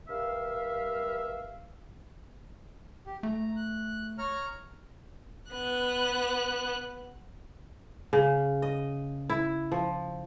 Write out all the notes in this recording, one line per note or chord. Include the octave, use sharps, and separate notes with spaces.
G2 A#4 E5 F5
G4
A3 A#5
F#6
C#5 A#5 F6
B3 F#6
C#3
D#5
E4
F3